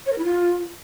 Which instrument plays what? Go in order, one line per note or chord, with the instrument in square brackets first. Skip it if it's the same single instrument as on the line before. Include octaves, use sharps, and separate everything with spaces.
[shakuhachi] C#5
A#4
E4
F4